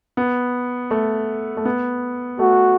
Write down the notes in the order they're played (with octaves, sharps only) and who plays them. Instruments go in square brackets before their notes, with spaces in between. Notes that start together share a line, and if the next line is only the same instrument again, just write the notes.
[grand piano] B3
A3
A3
B3
[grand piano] A3 [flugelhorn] F#4